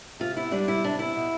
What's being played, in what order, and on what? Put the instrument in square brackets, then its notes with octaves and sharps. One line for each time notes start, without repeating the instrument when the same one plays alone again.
[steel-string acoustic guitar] C3 F4
B3 E4
G3 D4
C3 E4
C3 D4
B3 E4
B2